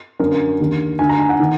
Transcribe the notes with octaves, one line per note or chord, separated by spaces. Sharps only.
F#2 D3 A#4
D#2 D3
D2 D3 G#5
A#5
G#5
F#5
D#3